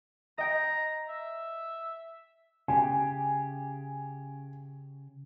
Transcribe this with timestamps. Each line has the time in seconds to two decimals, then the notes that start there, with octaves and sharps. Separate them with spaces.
0.38 D#5 G5 A#5
1.09 E5
2.68 C#3 G4 G#5